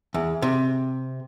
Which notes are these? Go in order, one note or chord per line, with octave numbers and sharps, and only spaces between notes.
E2
C3